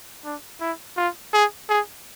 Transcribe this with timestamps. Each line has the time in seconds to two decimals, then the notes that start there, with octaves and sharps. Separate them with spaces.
0.25 D4
0.60 E4
0.97 F4
1.34 G#4
1.69 G#4